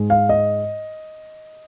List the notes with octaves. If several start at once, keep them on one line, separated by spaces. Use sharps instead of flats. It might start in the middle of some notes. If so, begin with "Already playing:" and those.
Already playing: G#2 G#3
F5
D#5